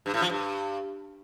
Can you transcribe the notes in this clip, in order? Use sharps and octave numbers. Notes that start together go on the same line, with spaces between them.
G2
A2
F3
G2